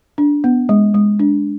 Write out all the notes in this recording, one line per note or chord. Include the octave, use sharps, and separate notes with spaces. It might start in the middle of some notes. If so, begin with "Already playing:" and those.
D4
B3
G#3
G#3
D4